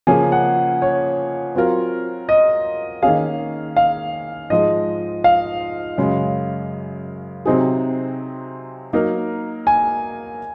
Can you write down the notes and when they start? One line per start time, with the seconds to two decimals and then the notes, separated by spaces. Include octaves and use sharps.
0.07 C#3 F3 A#3 C#4 G#4 G#5
0.32 F#5
0.82 C#5
1.55 F#3 C4 F4 A#4
2.29 D#5
3.03 D#3 A#3 C#4 G#4 F5
3.76 F5
4.50 G#2 F3 G#3 D#5
5.24 F5
5.98 F#2 C#3 G#3 C#4
7.46 C3 F#3 C4 D#4 G#4
8.93 F#3 A#3 D#4 A#4
9.67 G#5